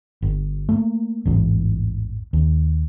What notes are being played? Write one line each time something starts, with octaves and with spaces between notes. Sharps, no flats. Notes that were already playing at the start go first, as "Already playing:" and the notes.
G1
A3 A#3
A1 E2 G#2
D#2